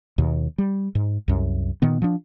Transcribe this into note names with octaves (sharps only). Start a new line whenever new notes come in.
D#2 B2
G3
G#2
C2 F#2
A#2 D#3 B3
F3 D4